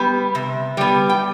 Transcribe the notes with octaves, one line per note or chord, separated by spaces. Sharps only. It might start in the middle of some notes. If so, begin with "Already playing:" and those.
Already playing: G3 B3
C3
G3 B3
G5